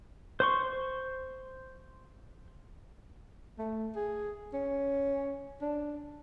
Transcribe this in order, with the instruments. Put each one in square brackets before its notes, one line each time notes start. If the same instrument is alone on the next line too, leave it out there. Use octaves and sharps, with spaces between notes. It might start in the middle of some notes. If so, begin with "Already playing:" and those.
[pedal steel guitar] C5 C6 C#6
[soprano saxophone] A3
G#4
C#4
D4